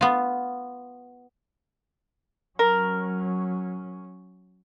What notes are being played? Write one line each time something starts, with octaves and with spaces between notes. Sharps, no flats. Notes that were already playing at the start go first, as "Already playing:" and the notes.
B3 F4
F#3 C#4 A#4